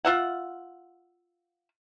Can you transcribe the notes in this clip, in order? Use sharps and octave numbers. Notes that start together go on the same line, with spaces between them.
F4 E5 F#5